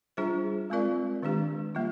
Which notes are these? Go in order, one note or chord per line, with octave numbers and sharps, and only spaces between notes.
G3 D4 F4 G#4 C5
G#3 C4 F4 A#4 D5
D#3 G#3 D4 G4
G3 A#3 F4